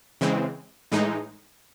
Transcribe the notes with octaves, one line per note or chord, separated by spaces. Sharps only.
C#3 E3 G#3 C4
A2 E3 G#3 D#4